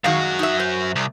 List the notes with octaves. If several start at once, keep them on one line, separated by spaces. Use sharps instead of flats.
F#2 D#3 G#3 F#4 F5
D#4 E5
C5
C2